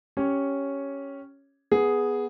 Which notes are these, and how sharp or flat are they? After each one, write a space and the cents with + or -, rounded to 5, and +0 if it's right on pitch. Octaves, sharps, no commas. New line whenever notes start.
C#4 +0 G4 +0 C#5 +0
B3 -5 G#4 +0